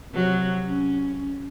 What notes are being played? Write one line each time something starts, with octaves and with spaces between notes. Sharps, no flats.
C3 F#3
C#4